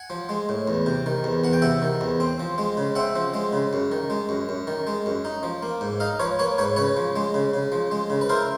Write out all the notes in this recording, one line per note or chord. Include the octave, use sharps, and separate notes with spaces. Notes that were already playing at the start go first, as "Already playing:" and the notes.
Already playing: F#5 G#5
F3
G#3
A2
E2
C3
D#3
E2
E2 F#5
G5
C3 E5 F#5
D#3
E2
C4
F3
G#3
C#3
C4 E5 F#5
F3
G#3
C#3
F#2
D#3
G#3
F#2
F#2
D#3
G#3
F#2
D#4
F3
A#3
G#2
D#4 D#5 F5
F3 B4 C#5
A#3 B4 C#5
G#2 B4 C#5
C#3 B4 C#5
F3
G#3
C#3
C#3
F3
G#3
C#3
B4
E4 A#4 C5